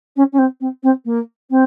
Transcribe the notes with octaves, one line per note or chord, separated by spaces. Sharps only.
C#4
C#4
C4
C4
C4
A#3
C4